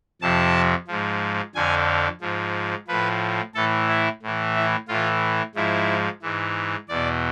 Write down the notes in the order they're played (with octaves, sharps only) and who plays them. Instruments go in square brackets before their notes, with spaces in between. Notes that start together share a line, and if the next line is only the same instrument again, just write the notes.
[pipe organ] F2 C3 F3 A5
G#2 F3
F2 D3 F3 G#5
G#2 F3
A2 F3 B4
A2 E3 A4
E4
A2 E3
E4
A2 E3 F4
G#2 F3 E4
G#2 E3
E2 B2 D5